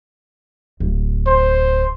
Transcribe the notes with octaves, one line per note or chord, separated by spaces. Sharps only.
D1
C5